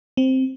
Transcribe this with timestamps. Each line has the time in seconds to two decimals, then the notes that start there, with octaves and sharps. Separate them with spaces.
0.17 C4